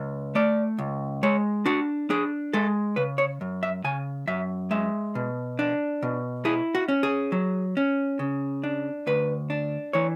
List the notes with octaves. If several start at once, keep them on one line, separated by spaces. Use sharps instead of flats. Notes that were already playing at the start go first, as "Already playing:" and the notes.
Already playing: C#2
A3 D5
C#2
G#3 C#5
D4 F#4
D4 G#4
G#3 A4
C#3 B4
C#5
F#2
E5
C#3 G#5
F#2 E5
G#3 E5
B2
D4
B2
E4 G#4
F#4
C#4
G#4
F#3
C#4
C#3
D4
D2 B4
D4
E3 C#5